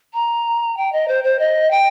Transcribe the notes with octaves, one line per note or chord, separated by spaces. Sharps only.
A#5
G5
D#5
C5
C5
D#5
G5